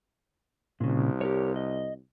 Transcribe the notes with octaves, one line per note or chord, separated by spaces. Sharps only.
C2 A#2 C#3
G4 A#4 C#5
D#5